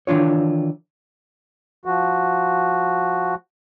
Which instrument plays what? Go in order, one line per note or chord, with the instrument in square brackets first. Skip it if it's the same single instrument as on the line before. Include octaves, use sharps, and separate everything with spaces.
[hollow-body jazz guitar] D#3 E3 D4 F4 C#5
[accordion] F3 F#4